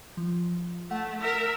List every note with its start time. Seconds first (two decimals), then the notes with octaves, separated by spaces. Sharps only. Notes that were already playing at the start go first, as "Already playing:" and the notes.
0.17 F3
0.91 A3 F#5
1.22 A#4 E5